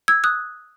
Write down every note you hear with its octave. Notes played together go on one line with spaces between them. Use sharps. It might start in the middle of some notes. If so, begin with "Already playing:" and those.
E6 G#6
D#6 F#6